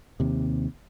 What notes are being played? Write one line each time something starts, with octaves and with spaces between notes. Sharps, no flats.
D#2 C3